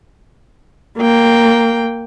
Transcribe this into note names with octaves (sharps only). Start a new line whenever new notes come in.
A#3 G5